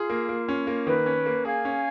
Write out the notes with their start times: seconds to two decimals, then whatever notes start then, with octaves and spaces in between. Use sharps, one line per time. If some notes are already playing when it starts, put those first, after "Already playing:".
Already playing: F4 G#4
0.10 A#3
0.29 A#3
0.49 C#4
0.67 A#3
0.86 D#3 B4
1.06 C#4
1.26 A#3
1.45 G#4 F5 G#5
1.65 C#4